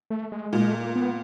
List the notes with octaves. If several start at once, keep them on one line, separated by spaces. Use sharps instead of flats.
A3
G#3
A#2 G#3
A3
A#3
B3